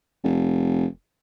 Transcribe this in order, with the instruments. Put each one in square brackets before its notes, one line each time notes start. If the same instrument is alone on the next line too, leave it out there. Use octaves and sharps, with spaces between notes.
[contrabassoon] F1